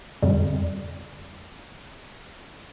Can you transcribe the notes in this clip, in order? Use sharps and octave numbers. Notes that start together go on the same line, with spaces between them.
F2 D3 G3